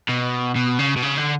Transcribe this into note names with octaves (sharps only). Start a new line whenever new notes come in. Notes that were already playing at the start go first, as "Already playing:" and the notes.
B2
B2
C#3
B2
C#3
D3